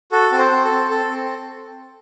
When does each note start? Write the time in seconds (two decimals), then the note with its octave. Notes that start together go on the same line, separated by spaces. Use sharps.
0.12 F#4 A4
0.32 C4
0.38 C5
0.52 C4
0.65 A4
0.72 C4
0.91 A4
1.11 C4